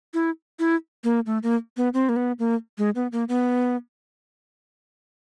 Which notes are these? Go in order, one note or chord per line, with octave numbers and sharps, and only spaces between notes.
E4
E4
A#3
A3
A#3
B3
C4
A#3
B3
A#3
G#3
B3
A#3
B3